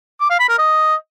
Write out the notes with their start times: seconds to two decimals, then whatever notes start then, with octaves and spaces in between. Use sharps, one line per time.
0.21 D6
0.30 F5
0.40 B5
0.49 A#4
0.59 D#5